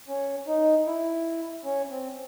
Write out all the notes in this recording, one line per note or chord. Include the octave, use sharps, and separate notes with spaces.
C#4
D#4
E4
C#4
C4